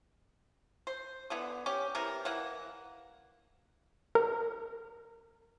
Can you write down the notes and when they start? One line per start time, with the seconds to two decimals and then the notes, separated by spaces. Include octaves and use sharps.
0.87 C5
1.30 D3 E3 B3
1.66 C#4 G4
1.95 C3 E3 A#4
2.25 E3 A#3 F#5
4.15 A#4